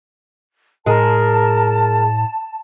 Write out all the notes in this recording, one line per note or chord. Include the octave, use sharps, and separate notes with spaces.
A2 G#3 G#4 A#4 A5